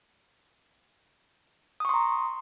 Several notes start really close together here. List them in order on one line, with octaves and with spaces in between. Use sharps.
D#6 C#6 C6 A#5